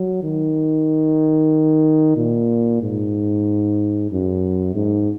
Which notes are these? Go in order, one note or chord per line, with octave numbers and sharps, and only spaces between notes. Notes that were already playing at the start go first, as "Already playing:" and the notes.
Already playing: F#3
D#3
A#2
G#2
F#2
G#2